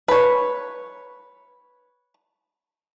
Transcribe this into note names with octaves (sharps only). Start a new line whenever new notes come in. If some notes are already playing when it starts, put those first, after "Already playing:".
B4 C#5